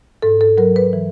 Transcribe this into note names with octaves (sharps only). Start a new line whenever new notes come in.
G#2 A4
A4
F#3 A#4
B4
E3